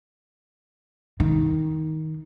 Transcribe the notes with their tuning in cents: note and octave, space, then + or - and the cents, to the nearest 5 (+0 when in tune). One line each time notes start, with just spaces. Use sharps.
D#3 +15